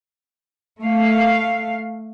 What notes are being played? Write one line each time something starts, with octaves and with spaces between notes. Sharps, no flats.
A3 F5